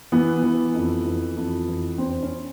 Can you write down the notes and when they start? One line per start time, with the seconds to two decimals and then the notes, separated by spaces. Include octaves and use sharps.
0.12 E3 B3
0.43 E3
0.75 F2
1.06 E3
1.37 F2
1.68 E3
1.98 E2 C4
2.23 C#4